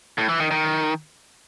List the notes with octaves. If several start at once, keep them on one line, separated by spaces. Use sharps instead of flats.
A2
E3
D#3
D#3